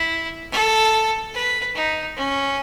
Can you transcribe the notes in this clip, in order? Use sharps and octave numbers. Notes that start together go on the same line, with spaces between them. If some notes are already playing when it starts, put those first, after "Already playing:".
Already playing: E4
A4
B4
D#4
C#4